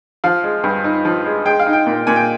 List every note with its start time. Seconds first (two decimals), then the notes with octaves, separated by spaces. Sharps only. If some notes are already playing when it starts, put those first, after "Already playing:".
0.24 F3 F5
0.44 G#3
0.64 G2
0.84 D#4
1.05 F3
1.26 G#3
1.45 G#3 G5
1.59 F5
1.67 D#4
1.73 G5
1.87 A#2
2.07 A#2 G#5
2.16 G5